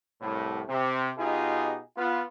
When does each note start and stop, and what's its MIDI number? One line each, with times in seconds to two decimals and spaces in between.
0.21 0.62 36
0.21 0.62 45
0.68 1.10 48
1.18 1.78 47
1.18 1.78 63
1.18 1.78 65
1.18 1.78 67
1.18 1.78 68
1.97 2.22 59
1.97 2.22 65